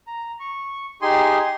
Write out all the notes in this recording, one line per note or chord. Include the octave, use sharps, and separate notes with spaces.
A#5
C#6
D#4 G4 G#4 G#5 C6